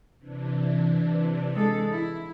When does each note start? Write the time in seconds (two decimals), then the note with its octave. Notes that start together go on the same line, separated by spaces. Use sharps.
0.18 C3 E3 D4
1.54 G#3 A4
1.92 E4